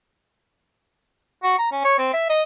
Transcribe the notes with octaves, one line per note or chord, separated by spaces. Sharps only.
F#4
A#5
C#4
C#5
C4
E5
D#5